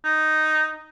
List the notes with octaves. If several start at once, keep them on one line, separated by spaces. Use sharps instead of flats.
D#4